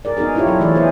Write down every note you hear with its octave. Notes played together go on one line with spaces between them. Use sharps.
G#4 A#4 D5
B3 D#4 F#4 G#4 A#4
D4 E4 F4 G4 C#5
F#3 E4 A4
E3 A3 G#4 C#5 D5
B3 E4 G#4 C5